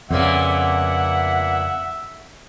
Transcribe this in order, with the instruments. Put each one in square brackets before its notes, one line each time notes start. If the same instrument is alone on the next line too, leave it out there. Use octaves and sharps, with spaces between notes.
[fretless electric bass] F2 C#3 [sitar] A#2 A#3 B3 [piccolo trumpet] E5 [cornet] F#5